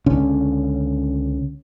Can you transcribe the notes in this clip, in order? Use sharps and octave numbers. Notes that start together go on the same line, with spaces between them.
C#2 D3 C#4